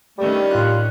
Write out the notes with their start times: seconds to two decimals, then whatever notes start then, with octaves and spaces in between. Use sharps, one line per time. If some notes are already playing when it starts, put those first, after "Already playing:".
0.18 D#3 G3 A3 C#4 D4
0.51 A2 F4 F#6